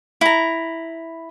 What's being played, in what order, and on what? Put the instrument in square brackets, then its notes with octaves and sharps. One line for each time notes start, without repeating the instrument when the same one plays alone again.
[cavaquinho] E4 A#5